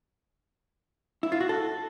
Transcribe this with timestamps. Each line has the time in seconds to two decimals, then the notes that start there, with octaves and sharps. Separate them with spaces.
1.23 E4
1.32 F4
1.41 F#4
1.49 A4